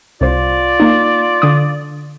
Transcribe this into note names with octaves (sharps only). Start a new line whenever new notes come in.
C2 F4 C5 D5
A#3 D#4
D3 D#6